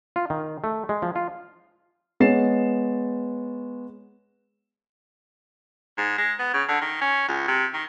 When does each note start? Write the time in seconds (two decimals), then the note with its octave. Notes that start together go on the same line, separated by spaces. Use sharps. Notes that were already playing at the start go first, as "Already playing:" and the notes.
0.16 F4
0.30 D#3
0.64 A3
0.89 G#3
1.02 F3
1.16 F4
2.20 G#3 B3 C#5 A6 C7 E7
5.98 G#2
6.18 G#3
6.39 B3
6.53 C#3
6.69 D3
6.81 D#3
7.01 C#4
7.28 C#2
7.48 C3
7.74 D#3